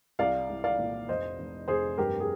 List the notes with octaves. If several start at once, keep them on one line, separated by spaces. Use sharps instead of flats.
C2 D5 F5
C2
D5 F5
A#2
F1 C5 D#5
F1
F1 G#4 C5
G2 G4 A#4
G#4